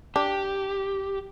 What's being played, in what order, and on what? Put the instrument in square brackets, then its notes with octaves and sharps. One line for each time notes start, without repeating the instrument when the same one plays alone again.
[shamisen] D4 [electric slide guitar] G4